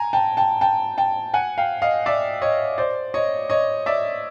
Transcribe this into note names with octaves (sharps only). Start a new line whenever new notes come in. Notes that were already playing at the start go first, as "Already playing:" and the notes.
Already playing: G#5 A#5
G5 A5
G5 A5
G5 A5
G5 A5
F#5 G#5
F5 G5
D#5 F5
D5 E5
C#5 D#5
C5 D5
C#5 D#5
C#5 D#5
D5 E5